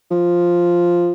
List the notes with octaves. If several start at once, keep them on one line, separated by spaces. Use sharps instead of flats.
F3